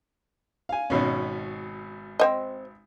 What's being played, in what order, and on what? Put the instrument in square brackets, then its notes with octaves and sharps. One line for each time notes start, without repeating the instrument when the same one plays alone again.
[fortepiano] F5 G#5
G#1 B2 C#4
[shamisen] C4 C5 D#5